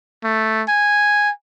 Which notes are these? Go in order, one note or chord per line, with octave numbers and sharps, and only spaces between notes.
A3
G#5